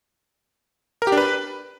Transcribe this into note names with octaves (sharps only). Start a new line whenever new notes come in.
A#4
G4
D4
B4